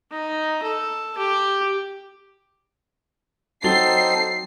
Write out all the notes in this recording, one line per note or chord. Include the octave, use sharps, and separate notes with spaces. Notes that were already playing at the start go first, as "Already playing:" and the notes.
D#4
A4
G4
F#3 C4 D#4 A4 A6 C7 G7